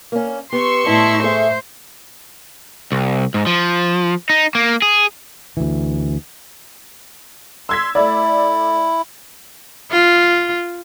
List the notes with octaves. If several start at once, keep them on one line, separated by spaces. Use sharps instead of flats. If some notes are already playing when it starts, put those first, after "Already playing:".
A#3 C#4
B3 G4 C6 C#6 E6
A2 E4 D#5 A5
G#4 A4 C5 E5
C2
G#2
F3
D#4
A#3
G#4
D2 E3
C6 E6 G#6 B6
A3 E4 D5
F4